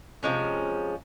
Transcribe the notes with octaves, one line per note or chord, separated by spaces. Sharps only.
C3 F3 G#3 C#4